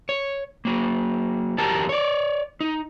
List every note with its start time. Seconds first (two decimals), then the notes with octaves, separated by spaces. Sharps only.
0.09 C#5
0.65 F#3 A#3
1.58 E2 F#3 G4 A#4 A5 A#5
1.89 C#5 D5
2.61 D#4